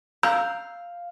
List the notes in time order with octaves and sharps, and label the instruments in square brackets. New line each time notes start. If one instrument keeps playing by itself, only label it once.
[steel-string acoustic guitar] F5 [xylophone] A#5 E6 G6